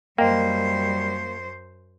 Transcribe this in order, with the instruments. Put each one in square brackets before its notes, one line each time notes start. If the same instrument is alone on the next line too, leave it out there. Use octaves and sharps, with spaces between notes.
[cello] F#2 C5 [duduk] G3 [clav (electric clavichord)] A#3 [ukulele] D#5 G5